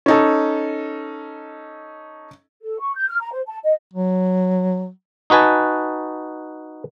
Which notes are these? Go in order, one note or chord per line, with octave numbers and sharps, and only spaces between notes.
C#4 D#4 A4
A4
C#6
G6
F6
A#5
C5
A5
D#5
F#3
D#4 F#4 B4 G#5 A5